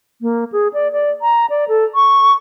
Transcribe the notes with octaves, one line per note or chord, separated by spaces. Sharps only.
A#3
G#4
D5
D5
A#5
D5
A4
C#6